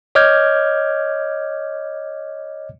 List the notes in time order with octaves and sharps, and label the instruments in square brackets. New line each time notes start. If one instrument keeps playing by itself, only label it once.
[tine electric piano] C#5 D#5 D6 F6 G6 G#6